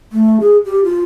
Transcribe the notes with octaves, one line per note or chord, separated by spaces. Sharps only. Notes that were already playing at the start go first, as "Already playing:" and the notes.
A3
G#4
G4
F4